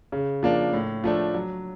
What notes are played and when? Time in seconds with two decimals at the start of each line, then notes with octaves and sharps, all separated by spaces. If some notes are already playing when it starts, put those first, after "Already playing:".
0.12 C#3
0.43 F3 A#3 D4
0.73 A2
1.04 F3 A3 D4
1.34 F#3